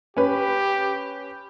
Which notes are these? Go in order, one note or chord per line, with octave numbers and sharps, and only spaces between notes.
C#4 G4 B4